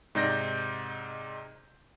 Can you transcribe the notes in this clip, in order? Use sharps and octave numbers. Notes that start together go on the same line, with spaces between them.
G#2 C3 D#4 D5 G6 A#6